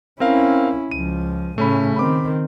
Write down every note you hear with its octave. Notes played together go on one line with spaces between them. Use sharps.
C4 C#4 E4 A#4 F5
C#2 F3 D#7
A2 C#3 A3 C#4 B5
D#3 C4 B5 D6